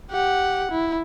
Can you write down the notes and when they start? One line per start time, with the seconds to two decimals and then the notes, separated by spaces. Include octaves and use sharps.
0.11 G4 F#5
0.71 E4